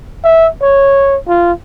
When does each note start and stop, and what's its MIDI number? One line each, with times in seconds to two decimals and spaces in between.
0.24 0.48 76
0.61 1.17 73
1.28 1.52 65